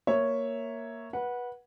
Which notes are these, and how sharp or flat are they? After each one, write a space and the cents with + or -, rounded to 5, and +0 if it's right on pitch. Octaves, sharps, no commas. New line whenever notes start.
A#3 +0 C#5 +0 E5 +0
B4 -20 F#5 -5